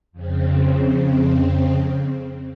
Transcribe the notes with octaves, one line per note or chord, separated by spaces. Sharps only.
F2 C#3 C4